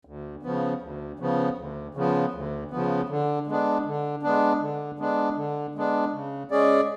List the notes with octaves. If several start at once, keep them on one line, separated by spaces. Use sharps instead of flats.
D2
C#3 F3 B3
D2
C#3 F3 B3
D2
C#3 F3 B3
D2
C#3 F3 B3
D3
G#3 B3 D4
D3
G#3 B3 D4
D3
G#3 B3 D4
D3
G#3 B3 D4
C#3
G#3 C#4 G#4 D5